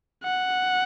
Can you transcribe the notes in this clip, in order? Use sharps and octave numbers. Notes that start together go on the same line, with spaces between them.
F#5